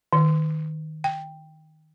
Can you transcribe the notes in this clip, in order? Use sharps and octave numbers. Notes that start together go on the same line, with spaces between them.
D#3
G5